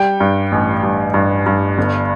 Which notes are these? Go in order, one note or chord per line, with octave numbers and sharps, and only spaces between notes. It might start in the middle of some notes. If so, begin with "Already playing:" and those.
Already playing: G3 G5
G2
A1
G2
G2
G2
G1